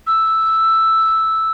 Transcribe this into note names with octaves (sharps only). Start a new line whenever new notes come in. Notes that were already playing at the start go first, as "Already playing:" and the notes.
E6